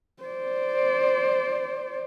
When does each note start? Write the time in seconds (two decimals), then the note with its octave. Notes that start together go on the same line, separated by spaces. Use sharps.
0.23 C5 D5